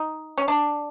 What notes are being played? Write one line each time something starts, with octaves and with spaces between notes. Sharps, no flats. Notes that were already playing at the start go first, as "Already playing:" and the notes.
Already playing: D#4
C#4
D4